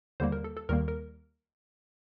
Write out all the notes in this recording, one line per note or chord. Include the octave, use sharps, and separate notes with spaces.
D#2 D3 G3 A#3 C5
A#4
A4
A4
D#2 D#3 G3 A#3 A#4
A#4